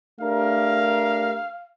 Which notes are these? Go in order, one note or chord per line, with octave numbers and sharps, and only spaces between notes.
A3 D4 G4 A#4 F5